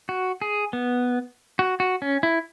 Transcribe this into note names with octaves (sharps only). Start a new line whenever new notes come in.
F#4
G#4
B3
F#4
F#4
C#4
E4